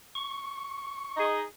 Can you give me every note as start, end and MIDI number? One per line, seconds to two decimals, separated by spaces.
0.15 1.26 85
1.16 1.41 63
1.16 1.41 68
1.16 1.41 75